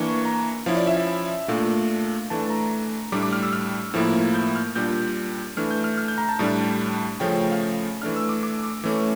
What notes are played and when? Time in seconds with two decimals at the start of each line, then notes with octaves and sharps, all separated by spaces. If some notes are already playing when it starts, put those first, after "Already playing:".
Already playing: E3 A#3 D4 C#6
0.25 A#5
0.66 F3 C#4 E4 F5
0.77 D5
0.87 E5
0.97 E5
1.48 A#2 A3 D4 F5
2.30 E3 A3 D4 A5
2.50 A#5
3.12 A2 G3 D4 D6
3.23 D6
3.33 F6
3.43 E6
3.53 F6
3.94 A2 F3 A#3 E4
4.34 G6
4.56 F6
4.76 A#2 G3 D4 G6
5.57 E3 A3 D4 F6
5.71 G6
5.84 F6
5.98 F6
6.08 G6
6.18 A#5
6.29 A5
6.39 A2 G3 D4
7.20 C#3 F3 A3 C#4 G5
7.30 G5
7.41 G5
7.51 F5
8.02 E3 A3 D4 F6
8.16 E6
8.29 D6
8.43 D6
8.84 E3 A3 C#4